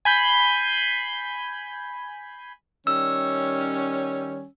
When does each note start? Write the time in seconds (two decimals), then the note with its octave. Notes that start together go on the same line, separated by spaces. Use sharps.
0.05 G#5 B5 G6 C7
2.87 D#3 G3 C#4 E6